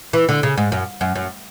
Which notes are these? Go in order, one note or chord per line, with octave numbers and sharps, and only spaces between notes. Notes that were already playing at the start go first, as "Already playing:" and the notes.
E3
D3
C#3
G#2
F#2
F#2
F#2